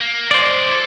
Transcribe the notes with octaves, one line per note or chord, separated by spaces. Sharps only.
A#3
F3 G#3 C5 D5
E4 A4